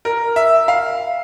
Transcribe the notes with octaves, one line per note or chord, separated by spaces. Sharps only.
A#4
E5
F5